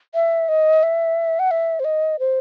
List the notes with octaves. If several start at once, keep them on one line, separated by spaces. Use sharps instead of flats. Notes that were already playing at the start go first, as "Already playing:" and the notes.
E5
D#5
E5
F#5
E5
C5
D#5
C5